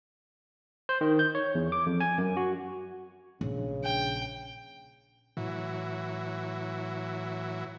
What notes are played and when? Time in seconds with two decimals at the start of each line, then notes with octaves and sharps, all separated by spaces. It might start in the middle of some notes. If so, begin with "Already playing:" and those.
0.89 C5
1.01 D#3
1.19 G6
1.35 C#5
1.55 E2
1.72 D6
1.86 F2
2.00 G#5
2.18 F#2
2.37 F#4
3.41 A#1 C#3
3.85 G5
5.37 A2 E3 F#3